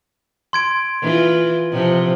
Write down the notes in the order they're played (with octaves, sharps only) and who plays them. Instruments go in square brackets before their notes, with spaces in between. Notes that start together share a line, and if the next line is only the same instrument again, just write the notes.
[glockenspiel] C6 G#6 D7
[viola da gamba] E3 F4
C3 F3